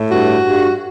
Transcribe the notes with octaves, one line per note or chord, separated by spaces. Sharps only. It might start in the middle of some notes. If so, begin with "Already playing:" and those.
Already playing: A2
G2 F#4
G2